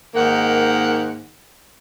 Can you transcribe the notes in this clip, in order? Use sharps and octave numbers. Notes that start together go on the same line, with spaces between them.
G#2 D#3 A#3 F#5